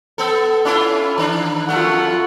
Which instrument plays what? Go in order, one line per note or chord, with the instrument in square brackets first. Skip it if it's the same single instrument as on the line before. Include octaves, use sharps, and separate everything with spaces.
[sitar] B3 A4
C#4 E4 F4
D#3 D4
[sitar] F2 A#2 A3 [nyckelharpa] F4 F#5